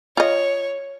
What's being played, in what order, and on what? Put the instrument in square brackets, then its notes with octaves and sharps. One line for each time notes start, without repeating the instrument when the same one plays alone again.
[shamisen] F4 D#5 [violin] C#5